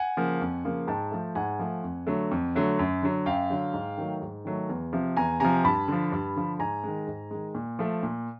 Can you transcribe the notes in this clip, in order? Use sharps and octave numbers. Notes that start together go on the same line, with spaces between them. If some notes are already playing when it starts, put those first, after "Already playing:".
Already playing: F#5 G#5
C#3 F3 A#3
F2
C#3 F3 A#3
G#2 G5 A5
F3 A3
G#2 F#5 G#5
F3 A3
F2
D3 F#3 A3
F2
D3 F#3 A3
F#2
D3 F#3
F#2 F5 G5
D3 F#3
G#2
D#3 F#3 A3
G#2
D#3 F#3 A3
E2
C3 F3
E2 G#5 A#5
C3 F3 G#5 A#5
G2 A5 B5
D3 F3
G2
D3 F3
G#2 G#5 A#5
D#3 G#3
G#2
D#3 G#3
A#2
F3 A3
A#2